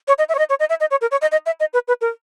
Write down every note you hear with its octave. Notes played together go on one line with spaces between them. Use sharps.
C#5
D#5
E5
C#5
D#5
C#5
D#5
E5
D#5
C#5
A#4
C#5
D#5
D#5
E5
D#5
B4
B4
A#4